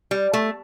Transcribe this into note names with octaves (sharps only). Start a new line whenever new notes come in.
G3
A3